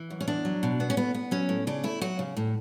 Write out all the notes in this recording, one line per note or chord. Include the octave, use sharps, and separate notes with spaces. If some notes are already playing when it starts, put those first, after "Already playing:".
Already playing: E3
F#2
C#4
E2 D4
F#3
B2
B3
C#4
A2 B3
B3
F#3 C#4
A2
C#3 D4
A3 E4
F#3 F#4
C#3
A2